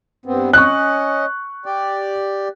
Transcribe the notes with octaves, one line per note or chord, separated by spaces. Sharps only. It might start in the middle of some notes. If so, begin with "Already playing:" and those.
G2 B3 C4
C#4 D#5 C#6 F#6
G4 D5